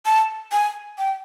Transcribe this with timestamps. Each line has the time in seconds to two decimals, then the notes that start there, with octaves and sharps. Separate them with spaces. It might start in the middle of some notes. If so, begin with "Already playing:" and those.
0.06 A5
0.52 G#5
0.98 G5